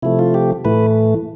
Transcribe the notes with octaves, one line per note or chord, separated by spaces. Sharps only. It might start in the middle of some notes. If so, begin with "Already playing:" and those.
C3 F3 A3 E4
F4
G4
A2 E3 A3 B4